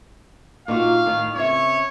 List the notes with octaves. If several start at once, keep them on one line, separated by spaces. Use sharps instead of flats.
A#2 D#4 F#4 F5
A2 D#3
C#3 C4 C#5 E5